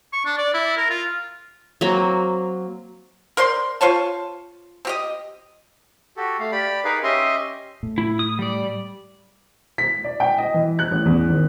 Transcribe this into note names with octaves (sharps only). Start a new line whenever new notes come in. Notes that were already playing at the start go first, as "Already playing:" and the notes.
C#6
D4
D5
E4
A#4
F4
F#3 A#3 C4
A#4 C5 D5 C6
F4 C5 C#5 A5
C4 G4 D#5
F#4 G4 A4
A3 F5
G4 D5 B5
D#4 G#4 A#4 B4 F5
C#4 G4 D#5 E5 C6
A2
E4
D#6
G3 D5
B6
D5
G5
D#5
E3
F#6
A1
E2
G#1